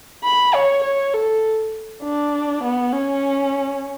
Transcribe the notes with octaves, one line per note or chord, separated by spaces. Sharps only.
B5
C#5
C#5
A4
D4
B3
C#4